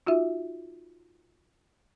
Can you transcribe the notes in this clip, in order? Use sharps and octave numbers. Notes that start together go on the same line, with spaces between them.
D#4 F4 F#4 E5